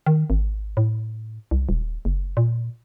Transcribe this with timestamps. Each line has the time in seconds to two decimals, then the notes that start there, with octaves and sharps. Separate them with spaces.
0.06 D#3
0.30 G#1
0.77 A2
1.51 C2
1.69 D#1
2.05 F#1
2.37 A#2